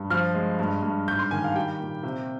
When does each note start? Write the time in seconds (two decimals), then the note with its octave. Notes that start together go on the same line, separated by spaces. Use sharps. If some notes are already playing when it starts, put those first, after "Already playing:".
Already playing: G2
0.10 F3 F6
0.34 G#3
0.60 G2
0.83 G2
1.08 G#2 G6
1.19 C6
1.31 D#3 G#5
1.44 F5
1.55 G3 G5
1.80 A#2
2.03 C3